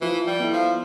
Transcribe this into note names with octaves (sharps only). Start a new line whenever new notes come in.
E3 F3
G3
B3 E4 A4
F3